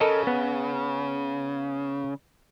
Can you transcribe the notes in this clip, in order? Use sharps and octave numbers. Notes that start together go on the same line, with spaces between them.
C#3 A4 A#4 D#5
B3